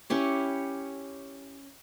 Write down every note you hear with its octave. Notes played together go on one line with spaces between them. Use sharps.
C#4 E4 G4 C#5